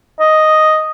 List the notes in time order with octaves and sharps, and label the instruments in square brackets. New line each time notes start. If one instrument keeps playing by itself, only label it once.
[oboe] D#5